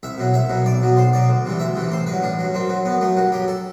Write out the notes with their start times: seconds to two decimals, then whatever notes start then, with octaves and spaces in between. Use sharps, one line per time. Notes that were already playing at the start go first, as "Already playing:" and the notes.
0.03 C2 E5
0.18 B2 F#3
0.34 C2 E5
0.49 B2 F#3
0.66 B1 D5
0.82 B2 F#3
0.96 B1 C5
1.13 B2 F#3 D5
1.29 D2
1.45 C3 E3 G3
1.59 D2 E5
1.76 C3 E3 G3
1.92 A1 C5
2.06 G2 B4
2.12 F#3
2.22 A1 D4
2.39 G2 F#3
2.54 F#2 C4
2.69 F#3
2.85 F#2 B3
3.01 F#3 A3
3.16 G2 F#4
3.32 F#3 G4
3.48 A4